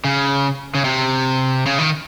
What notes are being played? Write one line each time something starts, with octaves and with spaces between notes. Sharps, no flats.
C#3
C#3
C3
C#3
D#3